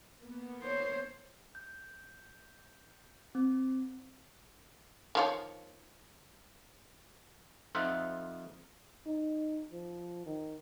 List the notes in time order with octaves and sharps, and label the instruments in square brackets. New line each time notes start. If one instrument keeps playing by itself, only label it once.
[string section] A#3 B3
[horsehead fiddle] C5 C#5
[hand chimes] G6
C4
[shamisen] D#3 F3 C#5
[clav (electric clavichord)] F2 D#4 F4 C5 E5 F#5
[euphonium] D#4
F3
D#3